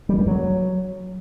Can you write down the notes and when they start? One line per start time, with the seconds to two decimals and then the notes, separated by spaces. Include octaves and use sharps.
0.09 G3
0.18 G2
0.27 F#3